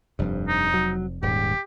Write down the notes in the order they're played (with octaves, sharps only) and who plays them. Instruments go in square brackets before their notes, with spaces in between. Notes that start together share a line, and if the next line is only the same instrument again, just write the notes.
[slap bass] F1 F3 [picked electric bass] G2
[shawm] D#4
[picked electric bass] F#3
[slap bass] D#1 [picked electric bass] G#2 [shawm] G4